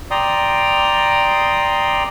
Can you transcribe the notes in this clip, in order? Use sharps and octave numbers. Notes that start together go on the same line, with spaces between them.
D5 G5 A#5 C6 D#6